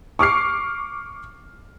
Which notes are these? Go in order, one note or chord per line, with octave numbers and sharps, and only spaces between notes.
C#6 D6 F6 C7